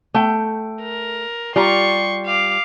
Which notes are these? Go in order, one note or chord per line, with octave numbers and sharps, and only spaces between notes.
A3 G5
A#4
G3 F4 A#5 C6 C#6
F5 D6